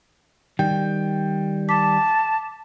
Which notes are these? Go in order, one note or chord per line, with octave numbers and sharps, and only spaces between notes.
D#3 G3 G5
A5 D6 B6